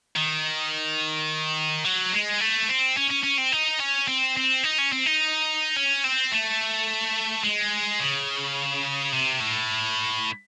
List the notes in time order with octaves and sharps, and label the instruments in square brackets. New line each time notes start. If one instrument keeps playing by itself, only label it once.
[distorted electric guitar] D#3
F#3
G#3
A3
C4
C#4
C#4
C#4
C4
D#4
C#4
C4
C4
D#4
C#4
C4
D#4
C#4
C4
A3
G#3
C#3
C3
A2